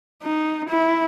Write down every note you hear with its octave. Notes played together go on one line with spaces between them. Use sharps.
D#4
E4